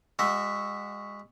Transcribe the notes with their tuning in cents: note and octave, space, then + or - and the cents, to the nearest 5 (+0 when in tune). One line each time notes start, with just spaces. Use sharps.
G#3 -25 F#4 +0 E5 +0